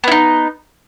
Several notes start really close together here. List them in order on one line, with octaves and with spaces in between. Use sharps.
B3 E4 D#4